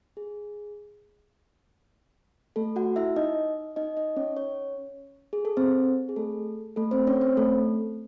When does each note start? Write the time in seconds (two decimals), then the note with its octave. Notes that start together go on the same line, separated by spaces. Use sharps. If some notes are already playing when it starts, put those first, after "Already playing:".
0.17 G#4
2.56 A3 A4
2.76 F#4 F#5
2.96 E4 E5
3.16 D#4 D#5
3.76 D#4 D#5
3.97 D#4 D#5
4.17 C#4 C#5
4.37 C#4 C#5
5.33 G#4
5.45 A4
5.57 C4 C5
6.09 G#4
6.16 A3 A4
6.76 A3 A4
6.91 C4 C5
7.07 C#4 C#5
7.21 C4 C5
7.37 A3 A4